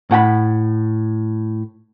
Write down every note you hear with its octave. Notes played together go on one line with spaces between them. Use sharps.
A2 F#5 G5 B5